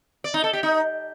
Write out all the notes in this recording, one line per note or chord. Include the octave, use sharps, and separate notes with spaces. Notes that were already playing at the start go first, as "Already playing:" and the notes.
D5
D#4
A4
G4
D#4